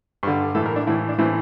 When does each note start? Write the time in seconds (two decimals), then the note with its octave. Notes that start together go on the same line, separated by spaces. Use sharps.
0.23 G2 D3
0.55 A2 E3 A4
0.66 A#4
0.76 D4
0.87 A2 E3 E4
1.09 D4
1.18 A2 E3 C4